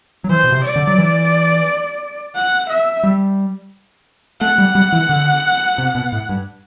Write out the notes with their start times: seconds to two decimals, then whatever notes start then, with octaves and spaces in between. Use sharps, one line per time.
0.24 F#3
0.30 E3 C5
0.44 B2
0.52 C3
0.64 D5
0.76 D3
0.87 F#3
0.98 E3
2.35 F#5
2.69 E5
3.03 G3
4.41 A3 F#5
4.58 G3
4.75 G3
4.92 E3
5.09 D3
5.78 C3
5.95 B2
6.12 A2
6.29 G2